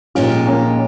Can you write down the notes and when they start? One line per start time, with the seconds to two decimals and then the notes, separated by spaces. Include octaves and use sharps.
0.15 A#2 F3 G#3 C#4 D#4 F4 G4
0.47 A#3 C#4